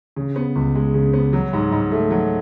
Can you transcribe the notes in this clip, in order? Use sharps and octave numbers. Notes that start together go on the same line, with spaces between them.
C#3
B3
C#2
G#3
C#3
B3
F#3
G#2
G#2
A3
F#3